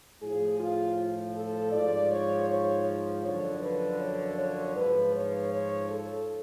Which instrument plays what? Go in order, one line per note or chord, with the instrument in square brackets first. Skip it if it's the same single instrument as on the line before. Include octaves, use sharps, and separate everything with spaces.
[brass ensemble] A2 F3 G#4
F4
A4
G#2 F3 D5
C#5
C#5
F#2 D3 F3 C#5
B4
C#5
C#5
G#2 F3 B4
C#5
C#5
A4